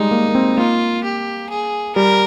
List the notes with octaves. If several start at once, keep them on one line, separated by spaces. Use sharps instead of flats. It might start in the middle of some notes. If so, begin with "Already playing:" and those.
Already playing: G3 G#3 D#4
A#3
A#3
C4
A#3 F4
G4
G#4
G3 A#4